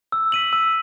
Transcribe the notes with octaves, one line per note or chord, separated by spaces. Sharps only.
E6
B6 D#7 F#7
E6